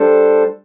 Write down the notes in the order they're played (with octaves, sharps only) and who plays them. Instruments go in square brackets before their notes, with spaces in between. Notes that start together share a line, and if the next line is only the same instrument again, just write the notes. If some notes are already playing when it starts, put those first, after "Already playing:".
Already playing: [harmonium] G3 D4 A4 C5